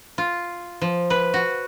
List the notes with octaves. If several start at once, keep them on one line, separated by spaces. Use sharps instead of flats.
F4
F3
B4
F#4